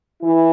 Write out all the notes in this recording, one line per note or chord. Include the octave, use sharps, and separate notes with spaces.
E3 E4